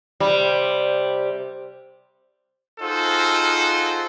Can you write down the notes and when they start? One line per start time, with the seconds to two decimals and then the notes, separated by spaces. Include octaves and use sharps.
0.20 C3 G3
2.81 D#4 F4 F#4 G#4 A4 C5